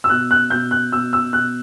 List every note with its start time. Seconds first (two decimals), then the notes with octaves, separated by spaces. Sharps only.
0.04 E6
0.09 B2 F#6
0.31 F#6
0.50 B2 G6
0.71 F#6
0.92 B2 E6
1.13 E6
1.33 B2 F#6